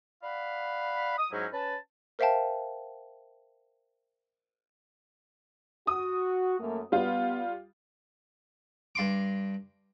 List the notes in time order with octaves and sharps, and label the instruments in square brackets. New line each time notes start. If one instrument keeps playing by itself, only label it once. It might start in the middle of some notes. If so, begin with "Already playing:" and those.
[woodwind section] D5 F5 F#5 B5
D#6
G#2 F#3 C#4 D#4 E4
C#4 B4 A5
[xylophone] A#4 C5 E5 F5 G5 A5
[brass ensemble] F#4 [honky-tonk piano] D#6
[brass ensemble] F#2 A3 A#3
[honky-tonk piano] G3 F4 [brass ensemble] B3
[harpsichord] G2 C6 D6